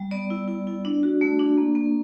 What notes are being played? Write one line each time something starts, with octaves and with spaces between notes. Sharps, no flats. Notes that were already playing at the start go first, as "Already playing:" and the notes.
Already playing: G3
B3 D5
E4
E4
E4
D4
F#4
A3
D4
A#3
A#3